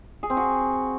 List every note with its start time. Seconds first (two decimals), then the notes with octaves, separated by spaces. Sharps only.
0.23 G#4
0.30 C4
0.37 F#4